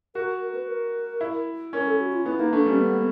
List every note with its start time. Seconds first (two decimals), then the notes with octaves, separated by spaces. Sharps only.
0.15 F#4 A#4
0.41 A#4
0.55 B4
0.67 A#4
1.21 E4
1.73 C#4 A#4
1.87 A4
2.00 F#4
2.12 F4
2.26 B3 E4
2.39 A#3 D#4
2.52 A3 D4
2.65 G3 C#4
2.79 B3